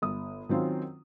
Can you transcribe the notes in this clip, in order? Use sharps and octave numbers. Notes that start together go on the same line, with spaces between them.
G1 D#6
D#3 F#3 C4 C#4 F4